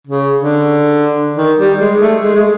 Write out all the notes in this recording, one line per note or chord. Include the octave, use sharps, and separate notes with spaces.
C#3
D3
D#3
G3
G#3
A3
G#3
G#3